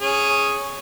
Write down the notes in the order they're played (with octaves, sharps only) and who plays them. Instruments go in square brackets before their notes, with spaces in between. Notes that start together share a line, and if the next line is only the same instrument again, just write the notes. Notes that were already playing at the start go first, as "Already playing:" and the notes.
[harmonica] C#4 G#4